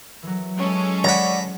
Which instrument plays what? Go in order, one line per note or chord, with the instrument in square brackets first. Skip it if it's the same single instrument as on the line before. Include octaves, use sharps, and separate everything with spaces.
[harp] E3 F#3
[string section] G#3 C#4 A4
[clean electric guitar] C#5 D5 F#5 [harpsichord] A#5 B5